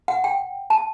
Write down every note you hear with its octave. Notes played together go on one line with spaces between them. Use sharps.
F#5
G5
A5